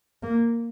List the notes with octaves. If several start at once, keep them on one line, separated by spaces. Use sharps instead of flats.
A#3